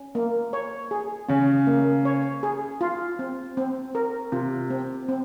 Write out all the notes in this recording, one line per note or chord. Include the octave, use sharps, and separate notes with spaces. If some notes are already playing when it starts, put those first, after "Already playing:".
Already playing: C#4
A#3
C#5
G#4
C#3 C#4
A#3
C#5
G#4
F4
C4
C4
A#4
C3 F4
C4
C4